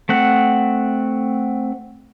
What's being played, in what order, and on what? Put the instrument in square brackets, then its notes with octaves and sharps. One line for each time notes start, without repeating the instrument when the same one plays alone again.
[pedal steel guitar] A3 C4 F#5